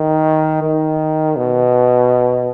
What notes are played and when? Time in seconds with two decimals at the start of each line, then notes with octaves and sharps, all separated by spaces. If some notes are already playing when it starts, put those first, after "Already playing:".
Already playing: D#3
0.62 D#3
1.36 B2